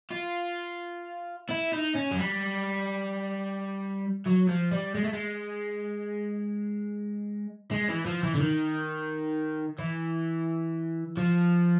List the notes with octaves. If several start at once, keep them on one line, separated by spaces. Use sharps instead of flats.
F4
E4
D#4
C#4
F#3
G3
F#3
F3
G3
G#3
A3
G#3
G#3
E3
F3
E3
D3
D#3
E3
F3